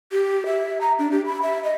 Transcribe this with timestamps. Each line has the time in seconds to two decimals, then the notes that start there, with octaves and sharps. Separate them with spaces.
0.12 G4
0.46 E5
0.81 A#5
0.99 D4
1.12 G4
1.26 B5
1.42 E5
1.64 D#5